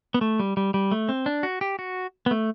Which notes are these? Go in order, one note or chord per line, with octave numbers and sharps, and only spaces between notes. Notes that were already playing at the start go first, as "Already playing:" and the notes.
B3
A3
G3
G3
G3
A3
C4
D4
F#4
G4
F#4
B3
A3